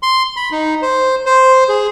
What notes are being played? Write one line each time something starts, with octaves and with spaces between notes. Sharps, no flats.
C6
B5
D#4
C5
C5
G#4